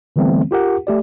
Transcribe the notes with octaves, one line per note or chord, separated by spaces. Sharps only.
D3 E3 G3 A3 B3 C4
F4 G4 A#4 F#5
A3 G4 D5